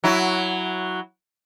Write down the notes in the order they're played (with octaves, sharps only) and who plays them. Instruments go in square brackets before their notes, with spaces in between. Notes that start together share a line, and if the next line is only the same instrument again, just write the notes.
[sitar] F#3 E4